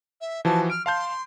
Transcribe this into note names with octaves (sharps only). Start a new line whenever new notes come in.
E5
E3 F3 F#4 A5
F6 D7
F5 A5 C6 G6